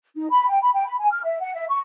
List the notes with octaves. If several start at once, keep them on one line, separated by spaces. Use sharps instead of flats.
D#4
B5
G5
B5
G5
B5
G#5
F6
E5
F#5
E5
C#6